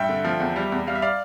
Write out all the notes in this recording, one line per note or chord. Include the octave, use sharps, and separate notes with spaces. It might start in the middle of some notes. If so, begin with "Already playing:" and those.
Already playing: G2 E5 G5
D3
F3
E2
G3
E2
G3 F5
E5
D5 F5